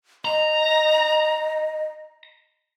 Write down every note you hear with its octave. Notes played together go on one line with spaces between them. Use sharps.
D#5 A#5